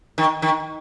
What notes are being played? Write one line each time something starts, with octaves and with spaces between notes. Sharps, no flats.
D#3
D#3